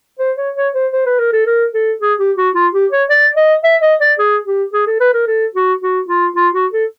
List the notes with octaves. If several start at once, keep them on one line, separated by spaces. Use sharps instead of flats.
C5
C#5
C#5
C5
C5
B4
A#4
A4
A#4
A4
G#4
G4
F#4
F4
G4
C#5
D5
D#5
E5
D#5
D5
G#4
G4
G#4
A4
B4
A#4
A4
F#4
F#4
F4
F4
F#4
A4